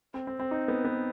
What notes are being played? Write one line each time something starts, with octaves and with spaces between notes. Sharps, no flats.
C4
C4
C4
D#4
B3
B3